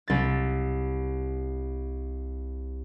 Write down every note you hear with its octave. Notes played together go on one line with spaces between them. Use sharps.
C2 A6